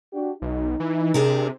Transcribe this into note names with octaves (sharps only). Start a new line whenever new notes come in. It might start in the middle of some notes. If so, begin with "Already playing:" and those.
D4 F#4 G4
B1 D#4
E3
C3 D4 G#4 A#4